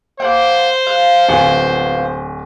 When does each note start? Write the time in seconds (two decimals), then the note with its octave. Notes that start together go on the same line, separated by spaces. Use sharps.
0.20 A#3 C5 F#5 G5
0.87 F5 F#6
1.29 D1 B3 F4 F#5 G#5